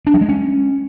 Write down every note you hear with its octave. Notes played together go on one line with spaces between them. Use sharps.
D4
F#3
G#3
C#4